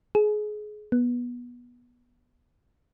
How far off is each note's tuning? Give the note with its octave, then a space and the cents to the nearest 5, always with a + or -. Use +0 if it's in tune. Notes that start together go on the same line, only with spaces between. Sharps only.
G#4 +25
B3 -20